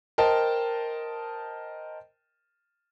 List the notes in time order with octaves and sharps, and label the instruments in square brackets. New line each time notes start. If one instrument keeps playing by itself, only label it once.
[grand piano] A#4 C5 D#5 G5 A5